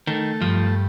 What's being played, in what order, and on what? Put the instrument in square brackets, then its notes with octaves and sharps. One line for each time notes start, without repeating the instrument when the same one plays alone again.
[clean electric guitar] D#3 [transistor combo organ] A3
[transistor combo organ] G2 [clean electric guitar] F3